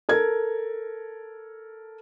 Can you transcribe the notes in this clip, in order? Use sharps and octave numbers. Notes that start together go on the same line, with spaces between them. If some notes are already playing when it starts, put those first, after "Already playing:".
A4 A#4 G#6